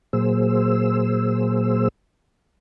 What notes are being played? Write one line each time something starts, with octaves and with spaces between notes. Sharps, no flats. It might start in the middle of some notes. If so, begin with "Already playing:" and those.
A#2 F#3 A#3 G#4 C5 E6